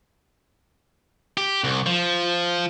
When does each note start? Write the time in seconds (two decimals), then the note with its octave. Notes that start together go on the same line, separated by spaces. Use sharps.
1.37 G4
1.64 C2
1.86 F3